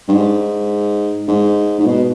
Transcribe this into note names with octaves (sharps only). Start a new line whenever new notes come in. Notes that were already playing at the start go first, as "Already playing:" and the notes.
G2
G#2
G#2
G#2
B2